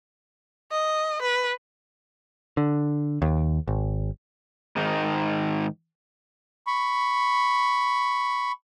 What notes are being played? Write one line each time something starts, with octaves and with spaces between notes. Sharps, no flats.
D#5
B4
D3
D#2
G#1
G#2 D#3 D#4
B5 C#6